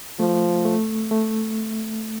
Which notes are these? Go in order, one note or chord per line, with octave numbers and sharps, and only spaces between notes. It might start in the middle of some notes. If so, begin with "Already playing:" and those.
F3 A3
A3
A3